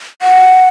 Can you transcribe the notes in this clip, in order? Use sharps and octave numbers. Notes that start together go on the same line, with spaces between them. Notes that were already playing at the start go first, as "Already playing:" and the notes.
F#5